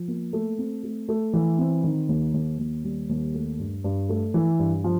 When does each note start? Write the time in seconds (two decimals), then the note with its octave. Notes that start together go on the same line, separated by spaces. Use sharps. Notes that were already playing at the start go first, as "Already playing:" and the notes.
Already playing: F3
0.08 A#3
0.33 A3
0.58 C4
0.83 A3
1.09 A3
1.33 E3
1.58 C4
1.84 D#3
2.09 D#2
2.34 D#2
2.59 D#2
2.84 G3
3.09 D#2
3.34 A3
3.59 G2
3.84 G2
4.09 A3
4.34 E3
4.59 G2
4.84 F3